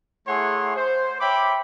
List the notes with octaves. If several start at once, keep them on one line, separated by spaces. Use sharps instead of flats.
A3 E4 G#4 C#5 F#5 C6
C5
C#5 E5 G5 B5 D6